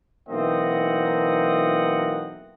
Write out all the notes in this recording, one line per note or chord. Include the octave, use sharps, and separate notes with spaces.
B1 E3 A#3 C4 D#5 F#5